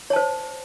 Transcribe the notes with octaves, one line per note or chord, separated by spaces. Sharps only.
C5 C#5 A5